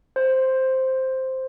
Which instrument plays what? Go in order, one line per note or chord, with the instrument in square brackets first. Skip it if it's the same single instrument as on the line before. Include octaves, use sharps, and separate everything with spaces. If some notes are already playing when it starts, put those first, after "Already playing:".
[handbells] C5